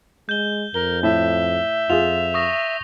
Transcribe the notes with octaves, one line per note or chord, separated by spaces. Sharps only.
G#3 G6 G7
F2 A#4 G7
A2 E5
F2 F4 G#4 F7
C#6 D#6 A#6